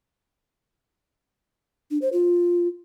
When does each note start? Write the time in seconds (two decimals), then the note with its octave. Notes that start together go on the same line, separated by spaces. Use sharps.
1.91 D4
2.02 C5
2.13 F4